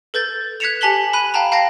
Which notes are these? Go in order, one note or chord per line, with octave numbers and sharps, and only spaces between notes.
A4 B4 G6 A6
F#6 G#6 B6 C#7 E7 F7
G4 G#5 A5 B6 F#7 G7
B5 F#6 D#7
F5 G5 A5 A#5
F5 G5 A5 A#6 C7